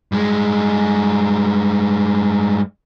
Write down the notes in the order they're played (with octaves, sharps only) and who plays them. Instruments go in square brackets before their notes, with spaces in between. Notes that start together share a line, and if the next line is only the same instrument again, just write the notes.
[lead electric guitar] G2 G#3